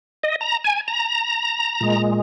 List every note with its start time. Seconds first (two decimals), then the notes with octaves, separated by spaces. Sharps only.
0.23 D#5
0.41 A#5
0.64 G#5
0.88 A#5
1.81 A#2 G#3